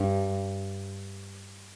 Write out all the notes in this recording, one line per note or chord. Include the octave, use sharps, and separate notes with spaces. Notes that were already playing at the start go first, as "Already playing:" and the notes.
Already playing: G2